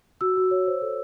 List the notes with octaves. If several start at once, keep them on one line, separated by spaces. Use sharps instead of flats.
F#4 E6
F#4
C#5
C5
A4